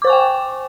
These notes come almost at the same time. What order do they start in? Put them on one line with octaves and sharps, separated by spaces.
D6 C5 C#6 G#5 G5